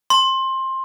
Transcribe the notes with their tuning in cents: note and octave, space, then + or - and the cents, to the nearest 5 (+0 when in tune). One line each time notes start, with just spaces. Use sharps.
C6 +20